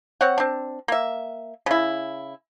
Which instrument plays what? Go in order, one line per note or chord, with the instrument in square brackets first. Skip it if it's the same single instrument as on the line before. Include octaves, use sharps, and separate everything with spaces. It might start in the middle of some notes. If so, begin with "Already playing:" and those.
[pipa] C4 C#5 F#5
C4 D4
A#3 E5
C#3 E4